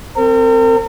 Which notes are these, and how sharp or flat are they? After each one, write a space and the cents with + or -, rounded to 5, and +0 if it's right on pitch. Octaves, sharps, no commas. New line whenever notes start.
C4 +0 A#4 -40